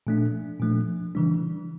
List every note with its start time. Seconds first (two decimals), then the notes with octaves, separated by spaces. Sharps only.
0.07 A#2 F3 A3 D4
0.60 A#2 F3 A3 D4
1.15 C#3 E3 G3 D4